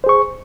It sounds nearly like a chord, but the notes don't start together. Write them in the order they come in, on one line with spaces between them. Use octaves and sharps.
C5 G#4 C#6